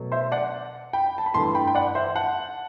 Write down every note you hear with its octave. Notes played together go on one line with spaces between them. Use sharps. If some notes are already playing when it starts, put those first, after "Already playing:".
Already playing: B2 F#3 A3
C5 E5
D5 F#5
G5 B5
A5
B5
G2 E3 A3 A5 C6
G5 B5
G5
D5 F#5
C5 E5
F#5 A5